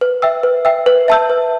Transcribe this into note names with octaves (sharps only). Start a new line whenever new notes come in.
B4
E5 G5 E6
B4
E5 G5 E6
B4
E5 A5 E6 G6
B4